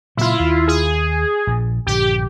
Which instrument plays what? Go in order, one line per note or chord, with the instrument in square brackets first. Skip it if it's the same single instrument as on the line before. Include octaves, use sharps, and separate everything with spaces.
[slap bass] A#2 C#3 F#3 [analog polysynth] E4 F4
[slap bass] D#2
[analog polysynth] G#4
[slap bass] A#1 A#2
[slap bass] A#1 G2 D3 [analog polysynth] G4